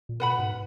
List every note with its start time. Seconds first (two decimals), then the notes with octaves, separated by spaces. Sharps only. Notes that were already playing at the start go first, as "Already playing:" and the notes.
0.09 A#2
0.20 B2 B4 F#5 B5
0.39 G#2